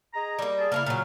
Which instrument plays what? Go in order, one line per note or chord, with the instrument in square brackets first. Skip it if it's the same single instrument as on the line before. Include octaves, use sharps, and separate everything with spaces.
[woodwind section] G#4 D#5 A#5
[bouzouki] G3 A#3
[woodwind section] G#4 A5
[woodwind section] C#3 F5 F6 [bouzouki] A#3 C#4 E4
[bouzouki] A#2 F#3